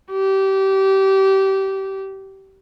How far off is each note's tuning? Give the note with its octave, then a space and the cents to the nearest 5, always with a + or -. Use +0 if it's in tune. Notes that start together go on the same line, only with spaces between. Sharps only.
G4 -25